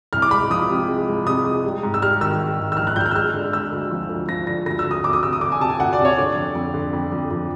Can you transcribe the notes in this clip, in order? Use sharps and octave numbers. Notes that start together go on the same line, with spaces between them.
C2 F6
D6
G#3 B5
F3 D#6
C3
G#3
G#3
C3 D#6
G#3
G3
G#2
E6
G3 F6
D#3 E6
G#2
D#3
E6
A#1 F6
F#6
A#1 F6 G6
F#6
E6
G#3 F6
D3
G#3 E6
D2
F3
D2
F3 A#6
D3 A#6
D2 A#6
E6
D2
D#6
D2 D6
D#6
C3 E6
D#6
D2 D6
G#5
C3 A5
G#5
D2 F#5
D5
C3
C#5
D3 D5
F2
F2
D3
F2
F2
F2